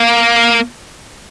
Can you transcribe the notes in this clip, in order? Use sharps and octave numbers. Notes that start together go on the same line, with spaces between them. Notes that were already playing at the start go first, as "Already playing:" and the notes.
Already playing: A#3